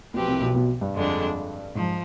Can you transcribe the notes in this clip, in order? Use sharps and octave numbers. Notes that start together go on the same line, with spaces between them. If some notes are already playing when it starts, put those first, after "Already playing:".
B1 B2 F3 C4 G4 B4
C2 C3
B1 B2
B1 B2
G2
F2 D3 G#3 D4
G#2 F3